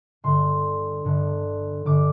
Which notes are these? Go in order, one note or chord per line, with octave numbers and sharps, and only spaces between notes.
G1 G2 D3 C6
G1 G2 D3
G1 G2 D3 D6